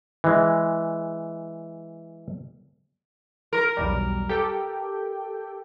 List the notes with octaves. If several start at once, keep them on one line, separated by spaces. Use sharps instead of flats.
E3 G#3
A#4
B1 E2 G3
G4 A4 G5